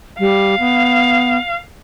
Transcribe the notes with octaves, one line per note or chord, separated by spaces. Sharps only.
G3 F5
B3